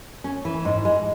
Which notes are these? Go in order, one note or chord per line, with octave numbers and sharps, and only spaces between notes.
C#4
E3
G#2
G#3